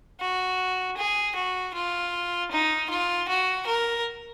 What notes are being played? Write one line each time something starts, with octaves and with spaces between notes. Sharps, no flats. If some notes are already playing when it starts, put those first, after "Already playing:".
F#4
G#4
F#4
F4
D#4
F4
F#4
A#4